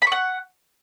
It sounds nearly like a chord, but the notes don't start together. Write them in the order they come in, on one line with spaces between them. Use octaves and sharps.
B5 C#6 F#5